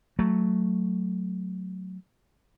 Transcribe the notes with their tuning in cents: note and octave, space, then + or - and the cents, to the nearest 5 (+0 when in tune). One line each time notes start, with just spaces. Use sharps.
F#3 +0 A3 +0